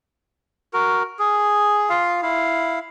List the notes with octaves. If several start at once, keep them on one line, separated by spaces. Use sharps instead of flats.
F#4 A#4
G#4
F4 F5
E4 F5